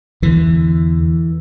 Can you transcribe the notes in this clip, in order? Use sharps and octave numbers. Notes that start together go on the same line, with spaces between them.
E2 D3 E3